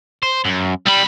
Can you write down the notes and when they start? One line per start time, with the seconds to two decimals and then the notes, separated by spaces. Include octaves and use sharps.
0.23 C5
0.45 F#2
0.86 C2 G3 B5